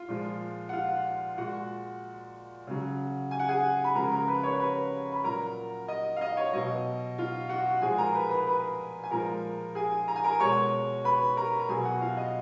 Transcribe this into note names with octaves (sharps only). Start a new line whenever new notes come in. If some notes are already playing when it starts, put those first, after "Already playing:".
Already playing: F4
A#2 F3 G#3
F#5
F4 F5
A#2 G#3 F#4 F#5
C#3 F#3
G#5
F#5
G#4 G#5
B5
C#3 F3 G#3 A#4 A#5
A#4 A#5
B4 B5
C#5 C#6
B4 B5
B5
A#2 F#3 A#4 A#5
D#5
F5
D#5
C#5
B2 F#3 D#5
F4 F5
F#4 F#5
A#2 F3 G#3 G#4 G#5
A#4 A#5
B4 B5
B4 B5
B4 B5
G#5
A#2 F3 G#3 A#4 A#5
G#4 G#5
A#5
G#5
A#4 A#5
B2 G#3 C#5 C#6
B4 B5
A#4 A#5
A#5
B2 F#3 G#4 G#5
F#4 F#5
F4 F5
D#5